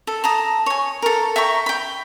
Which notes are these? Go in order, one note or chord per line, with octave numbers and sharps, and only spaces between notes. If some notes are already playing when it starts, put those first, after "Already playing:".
A4
A5 A#5 D#6
C#5 G#5
A4 A#4
E5 G5 A#5 C#6
G5 B5